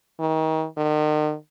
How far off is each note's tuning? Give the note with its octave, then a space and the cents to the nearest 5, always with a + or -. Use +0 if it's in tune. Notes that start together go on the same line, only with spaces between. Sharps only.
D#3 +30
D#3 -40